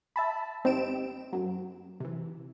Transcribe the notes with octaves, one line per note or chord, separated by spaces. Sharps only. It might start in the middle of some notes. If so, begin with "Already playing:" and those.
E5 A5 B5
G#1 C4 D#4 G4 D7 E7
F#2 F#3
C3 E3